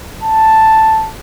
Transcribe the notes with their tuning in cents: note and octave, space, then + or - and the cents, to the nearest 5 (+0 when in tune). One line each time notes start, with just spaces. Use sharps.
A5 +0